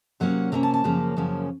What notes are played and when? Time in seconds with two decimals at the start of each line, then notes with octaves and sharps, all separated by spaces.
0.20 C3 F#3 A#3 C#4 F#5
0.52 C3 F#3 A#3 C#4 A#5
0.63 A5
0.74 A5
0.84 F#2 C#3 F3 A#3 C#4
1.16 F#2 C#3 F3 A#3 C#4